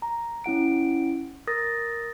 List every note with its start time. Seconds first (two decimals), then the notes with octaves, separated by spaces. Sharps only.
0.02 A#5
0.44 C#4 E4 F#5 D7
1.47 A#4 D#6 A6 A#6